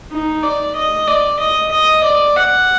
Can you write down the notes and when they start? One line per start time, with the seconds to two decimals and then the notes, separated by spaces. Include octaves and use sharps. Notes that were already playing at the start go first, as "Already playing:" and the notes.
0.11 D#4
0.43 D5
0.76 D#5
1.07 D5
1.40 D#5
1.71 D#5
2.04 D5
2.36 F#5